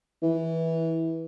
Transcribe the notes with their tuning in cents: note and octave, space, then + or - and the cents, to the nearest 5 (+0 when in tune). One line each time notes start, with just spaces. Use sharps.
E3 -15